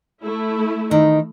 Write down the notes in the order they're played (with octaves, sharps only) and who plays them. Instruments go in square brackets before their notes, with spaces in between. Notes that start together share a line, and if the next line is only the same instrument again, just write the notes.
[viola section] A3 E4
[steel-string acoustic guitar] D#3 [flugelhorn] D#4